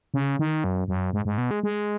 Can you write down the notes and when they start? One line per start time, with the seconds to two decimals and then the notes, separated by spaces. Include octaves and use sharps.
0.14 C#3
0.39 D#3
0.64 F#2
0.88 F#2
1.13 G#2
1.25 G#2
1.38 B2
1.51 G#3
1.63 G#3